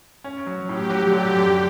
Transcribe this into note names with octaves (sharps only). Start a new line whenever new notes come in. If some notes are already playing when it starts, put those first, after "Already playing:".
C#4
F#3
A2 G4
F#3
D3 G4
F#2